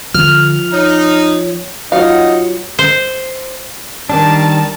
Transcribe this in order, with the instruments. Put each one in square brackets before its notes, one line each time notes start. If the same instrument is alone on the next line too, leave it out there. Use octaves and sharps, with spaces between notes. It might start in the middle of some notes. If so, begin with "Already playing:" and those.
[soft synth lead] D3 [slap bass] F3 [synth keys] F6
[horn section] D#4 [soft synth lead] C#5
[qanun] F#3 [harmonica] D#4 [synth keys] F4 F#5 C#7 [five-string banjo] F5
[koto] C5
[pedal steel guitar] D#3 G3 D4 [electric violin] A#4 A5